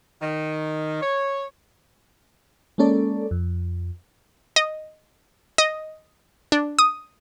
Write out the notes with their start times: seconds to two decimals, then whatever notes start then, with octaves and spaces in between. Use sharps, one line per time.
0.22 D#3
1.01 C#5
2.78 G#3 A#3 C#4 A4 D5
3.31 F2
4.56 D#5
5.58 D#5
6.52 D4
6.79 D#6